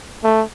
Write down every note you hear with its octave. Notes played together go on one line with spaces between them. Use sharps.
A3